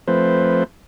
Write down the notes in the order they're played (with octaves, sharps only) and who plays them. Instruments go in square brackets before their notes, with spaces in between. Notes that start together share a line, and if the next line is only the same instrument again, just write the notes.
[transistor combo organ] F3 A3 C4 B4 C5